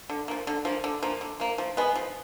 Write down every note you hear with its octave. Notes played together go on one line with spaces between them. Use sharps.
D3
F3 A#3
D3
F3 A#3
D3
F3 A#3
D3
F3 A#3
F3
G#3 B3
F3